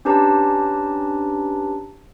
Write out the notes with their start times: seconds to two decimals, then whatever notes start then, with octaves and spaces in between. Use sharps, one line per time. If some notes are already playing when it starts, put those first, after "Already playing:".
0.05 C#4 D4 G4 B4 A5 A#5